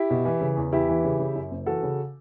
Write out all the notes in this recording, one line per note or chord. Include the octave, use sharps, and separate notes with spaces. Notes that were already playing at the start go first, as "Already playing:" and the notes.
Already playing: E4 G4
B2
E3
C#3
E2
E2 E4 G4
E3
C#3
C#3
F#2
F#1
E3 F#4 A4
C#3